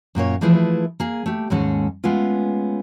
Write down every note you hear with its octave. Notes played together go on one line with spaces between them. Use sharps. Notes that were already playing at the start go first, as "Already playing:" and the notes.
F#2 A#2 A#3 C#5
E3 F3 A3 E4 G#4 B4
A#3 G#4
A3 G4
D#2 G#2 G#3 C#4 G#4 A4
G#3 A3 B3 C#4 F4